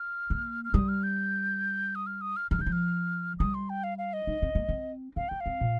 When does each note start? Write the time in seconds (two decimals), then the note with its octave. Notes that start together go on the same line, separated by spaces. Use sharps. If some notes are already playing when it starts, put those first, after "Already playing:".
Already playing: F6
0.30 A#3
0.65 F6
0.74 G3 D#6
0.88 F6
1.03 G6
1.95 D#6
2.06 F6
2.21 D#6
2.36 F6
2.51 F3 F6
2.59 D#3 G6
2.66 F3
2.72 F6
3.39 G3 D#6
3.54 C6
3.69 G5
3.84 F5
3.98 F5
4.13 D#5
4.27 D#4
4.42 C4
4.55 A#3
4.69 C4
5.16 C4 F5
5.29 A#3 G5
5.40 F5
5.46 C4
5.61 A#2